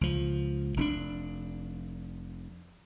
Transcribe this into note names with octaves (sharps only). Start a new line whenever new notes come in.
C#2 F3
F1 C#4 D4